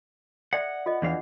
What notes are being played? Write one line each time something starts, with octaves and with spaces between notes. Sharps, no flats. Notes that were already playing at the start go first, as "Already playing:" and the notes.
A4 D5 E5 F#5
F4 A4 D#5
E2 E3 D4 G#4 F5 F#5